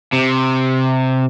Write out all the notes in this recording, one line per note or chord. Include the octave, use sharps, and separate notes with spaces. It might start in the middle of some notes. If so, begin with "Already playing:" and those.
C3